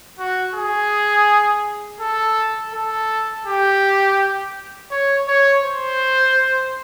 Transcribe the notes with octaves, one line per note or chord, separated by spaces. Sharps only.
F#4
G#4
A4
A4
G4
C#5
C#5
C5